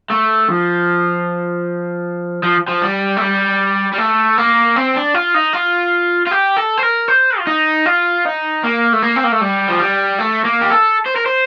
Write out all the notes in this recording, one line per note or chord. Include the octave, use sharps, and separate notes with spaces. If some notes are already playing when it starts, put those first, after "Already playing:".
A3
F3
F3
F3
G3
A3
G3
G3
A3
A#3
C4
D4
F4
D#4
F4
F4
G4
A4
C5
A#4
C5
F4
D#4
F4
D#4
A#3
A3
A#3
C4
A#3
A3
G3
F3
G3
A3
A#3
G4
A4
C5
A#4
C5